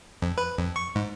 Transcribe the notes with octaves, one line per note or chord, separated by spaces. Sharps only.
F2
B4
F2
C#6
G#2